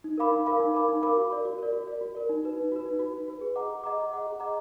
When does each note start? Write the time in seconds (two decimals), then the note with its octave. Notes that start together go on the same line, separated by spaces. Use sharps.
0.04 D#4
0.18 A#4 F5 B5 D6
0.32 D#4
0.46 A#4 F5 B5 D6
0.60 D#4
0.74 A#4 F5 B5 D6
0.89 D#4
1.02 A#4 F5 B5 D6
1.17 F#4
1.31 A#4 D5
1.45 F#4
1.58 A#4 D5
1.73 F#4
1.87 A#4 D5
2.01 F#4
2.15 A#4 D5
2.29 D#4
2.44 F#4 B4
2.57 D#4
2.72 F#4 B4
2.85 D#4
2.99 F#4 B4
3.13 D#4
3.28 F#4 B4
3.41 G#4
3.55 D#5 F#5 A#5 D6
3.69 G#4
3.84 D#5 F#5 A#5 D6
3.98 G#4
4.13 D#5 F#5 A#5 D6
4.27 G#4
4.40 D#5 F#5 A#5 D6